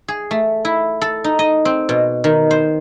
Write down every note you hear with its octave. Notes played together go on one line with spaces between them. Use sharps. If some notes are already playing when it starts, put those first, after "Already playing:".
G#4
A3
E4
A4
D#4
D#5
C4
B2
D#3
C5